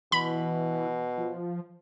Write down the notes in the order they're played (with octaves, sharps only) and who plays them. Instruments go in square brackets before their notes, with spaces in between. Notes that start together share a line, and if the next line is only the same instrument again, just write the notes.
[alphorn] B2 [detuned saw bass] E3 [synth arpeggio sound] B5
[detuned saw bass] F3